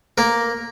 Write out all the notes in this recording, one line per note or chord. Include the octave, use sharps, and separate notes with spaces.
A#3 A#4